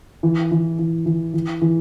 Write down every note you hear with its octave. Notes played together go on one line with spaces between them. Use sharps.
E3
E3
E3
E3
E3
E3